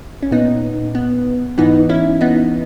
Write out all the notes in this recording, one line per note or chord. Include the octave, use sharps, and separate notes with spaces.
C#4
A#2 B3 D#4
B3
G#2 E3 B3 D#4
C#4 E4
B3 D#4